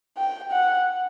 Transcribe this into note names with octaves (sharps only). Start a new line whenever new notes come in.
G5
F#5